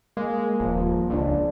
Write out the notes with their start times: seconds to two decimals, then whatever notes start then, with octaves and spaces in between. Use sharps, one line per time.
0.17 G#3 A#3
0.60 D#1 F3
1.10 C#2 D4